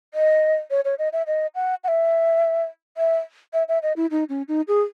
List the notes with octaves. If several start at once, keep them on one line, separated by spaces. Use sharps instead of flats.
D#5
C#5
C#5
D#5
E5
D#5
F#5
F#5
E5
E5
E5
E5
D#5
E4
D#4
C#4
D#4
G#4